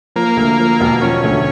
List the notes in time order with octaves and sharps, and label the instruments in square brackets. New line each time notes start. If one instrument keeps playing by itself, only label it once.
[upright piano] F3 [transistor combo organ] A#3
[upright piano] D2
F3
E1
[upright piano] F3 [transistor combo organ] C#4
[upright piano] D2